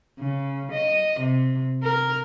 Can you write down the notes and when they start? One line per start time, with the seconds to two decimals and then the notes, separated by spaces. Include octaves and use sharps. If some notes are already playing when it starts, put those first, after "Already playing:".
0.20 C#3
0.72 D#5
1.20 C3
1.83 A#4